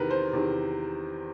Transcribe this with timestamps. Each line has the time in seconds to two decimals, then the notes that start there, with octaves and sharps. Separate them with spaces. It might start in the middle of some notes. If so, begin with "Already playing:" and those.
Already playing: E2 C3 D#3 A#4 B4
0.10 C5
0.33 E2 C3 D#3